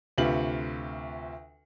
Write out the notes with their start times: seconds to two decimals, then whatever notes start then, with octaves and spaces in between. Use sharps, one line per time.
0.18 D2 C3 F4 B4 F#7